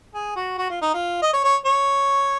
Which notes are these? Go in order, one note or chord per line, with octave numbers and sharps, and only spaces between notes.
G#4
F#4
F#4
F4
D#4
F4
D#5
C#5
C#5
C#5